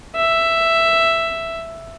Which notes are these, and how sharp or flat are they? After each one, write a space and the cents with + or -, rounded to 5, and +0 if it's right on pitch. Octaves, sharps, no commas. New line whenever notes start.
E5 +5